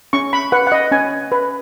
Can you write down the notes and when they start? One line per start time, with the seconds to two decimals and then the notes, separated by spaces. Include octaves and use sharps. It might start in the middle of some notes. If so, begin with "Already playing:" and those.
0.13 C#4 C#6
0.33 B5
0.52 B4 F#5
0.67 F#5
0.72 D#5
0.91 C#4 G#5
1.32 B4